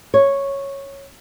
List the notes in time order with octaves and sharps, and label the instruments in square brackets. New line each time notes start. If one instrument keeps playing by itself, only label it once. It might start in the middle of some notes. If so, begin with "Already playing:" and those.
[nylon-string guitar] C#5